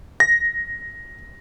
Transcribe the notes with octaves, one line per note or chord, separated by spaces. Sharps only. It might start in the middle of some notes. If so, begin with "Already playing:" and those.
A#6